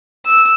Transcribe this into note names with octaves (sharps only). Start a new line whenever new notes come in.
E6